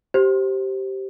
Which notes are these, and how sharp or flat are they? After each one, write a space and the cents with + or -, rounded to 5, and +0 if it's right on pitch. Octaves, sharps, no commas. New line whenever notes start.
G4 -15 C5 +15